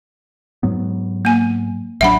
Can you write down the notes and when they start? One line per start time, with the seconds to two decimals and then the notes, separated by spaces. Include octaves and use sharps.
0.63 G#2 F#3 B3
1.25 A#3 G#5
2.01 A1 F#3 D4 E5 F#5 B5